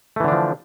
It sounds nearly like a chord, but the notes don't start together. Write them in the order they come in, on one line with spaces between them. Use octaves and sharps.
A3 E3 D3 D4 F3